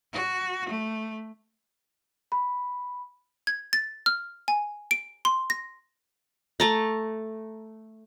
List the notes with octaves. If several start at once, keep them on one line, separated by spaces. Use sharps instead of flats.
F#4
A3
B5
G#6
A6
F6
G#5
D7
C6
A#6
A3 A5 A#5